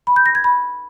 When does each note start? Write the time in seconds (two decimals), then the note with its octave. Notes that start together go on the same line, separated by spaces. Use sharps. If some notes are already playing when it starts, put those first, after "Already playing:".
0.07 B5
0.16 G6
0.26 A#6
0.35 G#6
0.44 B5